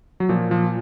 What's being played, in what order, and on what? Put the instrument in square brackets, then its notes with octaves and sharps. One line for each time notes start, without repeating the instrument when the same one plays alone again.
[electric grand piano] F#3
A#2 F3
F3